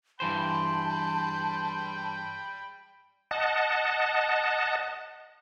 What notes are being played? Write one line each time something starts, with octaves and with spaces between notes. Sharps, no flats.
G2 E3 C5 G5 A5 B5 C6
D#5 F#5 A5